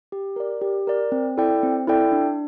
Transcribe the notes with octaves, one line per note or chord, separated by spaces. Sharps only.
G4
A#4 D5
G4
A#4 D5
C4
E4 A4 D5 G5
C4
E4 A4 D5 G5
D4